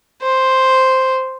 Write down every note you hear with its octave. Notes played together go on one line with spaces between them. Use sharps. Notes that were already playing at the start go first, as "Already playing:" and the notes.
C5